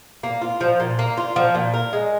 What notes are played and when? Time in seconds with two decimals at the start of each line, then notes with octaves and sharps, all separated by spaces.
0.23 A#3
0.41 F4
0.61 F3
0.80 A#2
0.99 A#3
1.17 F4
1.36 F3
1.55 A#2
1.74 A#4
1.93 G#3